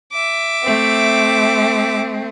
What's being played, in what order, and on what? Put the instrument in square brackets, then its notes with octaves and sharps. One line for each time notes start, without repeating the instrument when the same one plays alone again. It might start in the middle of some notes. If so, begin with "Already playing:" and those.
[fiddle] E5 D6
[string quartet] A3 C4